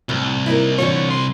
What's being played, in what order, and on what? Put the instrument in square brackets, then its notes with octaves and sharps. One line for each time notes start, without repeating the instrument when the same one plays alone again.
[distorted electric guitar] C2 [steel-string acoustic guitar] A2
[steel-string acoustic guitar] A#3 D#4 A#4 [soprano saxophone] E4
[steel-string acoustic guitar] D3 E3 F4 [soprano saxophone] C#5
[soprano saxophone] C6